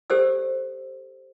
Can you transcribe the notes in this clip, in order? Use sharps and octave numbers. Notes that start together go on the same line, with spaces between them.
G4 A4 C5 D5 E6